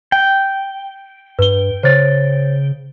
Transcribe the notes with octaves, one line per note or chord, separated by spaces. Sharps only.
G5
G2 B4 G7
C#3 C5 C#5 A6